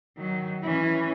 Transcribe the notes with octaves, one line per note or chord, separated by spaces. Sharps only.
D#3 F#3
E3 C#4